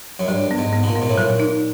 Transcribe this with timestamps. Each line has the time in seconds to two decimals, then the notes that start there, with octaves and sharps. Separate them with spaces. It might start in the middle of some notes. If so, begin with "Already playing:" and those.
0.19 F#2
0.28 G2 F#3
0.51 B3
0.58 G#2
0.73 B3
0.83 B2
0.88 A#2
0.95 B3
1.02 G#2
1.10 A2
1.18 A#2 F#3
1.40 D#4